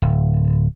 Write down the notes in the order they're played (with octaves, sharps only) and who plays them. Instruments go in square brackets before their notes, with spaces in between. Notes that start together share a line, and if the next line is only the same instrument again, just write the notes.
[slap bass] D1